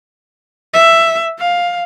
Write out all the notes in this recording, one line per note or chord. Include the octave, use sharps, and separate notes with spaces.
E5
F5